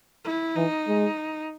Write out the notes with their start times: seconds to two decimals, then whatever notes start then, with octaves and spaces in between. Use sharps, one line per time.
0.25 E4
0.56 E3 D#4
0.88 G#3